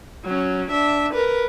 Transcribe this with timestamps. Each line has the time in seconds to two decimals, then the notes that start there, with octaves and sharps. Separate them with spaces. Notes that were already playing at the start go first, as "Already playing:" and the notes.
0.25 F#3 C#4
0.71 D4 E5
1.14 A#4 B4